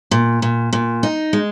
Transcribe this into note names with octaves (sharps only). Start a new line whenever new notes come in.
A#2
A#2
A#2
D#4
G#3